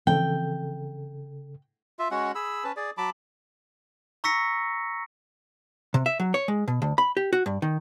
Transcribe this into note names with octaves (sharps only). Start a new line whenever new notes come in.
C#3 E3 F3 C4 A4 G5
F4 E5
G#3 C#4 F#4 F#5
G#4 B5 E6
C#4 B4 A5
G#4 D5
F#3 A5 B5 D6
A#5 C#6 E6 A#6 B6 C#7
C3
E5
F#3
C#5
G#3
B2
D2
B5
G4
F#4
G2
D#3